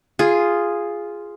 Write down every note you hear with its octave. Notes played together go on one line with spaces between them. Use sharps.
F4 G#4